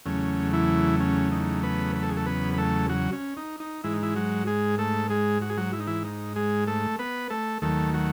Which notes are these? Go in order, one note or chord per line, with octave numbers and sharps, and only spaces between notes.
E2 C#3 F#3 A3 C#4
E3 E4
C#4
D#4
B3 B4
B4
A4
G#4
A3 A4
B3 B4
B4
A3 A4
F#3 F#4
C#4
D#4
D#4
G#2 E3 G#3 E4
D#4
E3 E4
F#3 F#4
G#3 G#4
A3 A4
G#3 G#4
F#4
G#4
F#3 F#4
E4
D#4
E3 E4
D#4
G#3 G#4
A3 A4
B3 B4
A3 A4
D#2 D#3 F#3 A3 A4
F#3 F#4